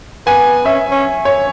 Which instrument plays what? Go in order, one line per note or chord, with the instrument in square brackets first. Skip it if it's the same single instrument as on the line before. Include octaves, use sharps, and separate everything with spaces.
[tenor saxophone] B3 [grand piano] G#5
[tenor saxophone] C#4 [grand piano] E5
[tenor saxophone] C#4
[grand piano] C#5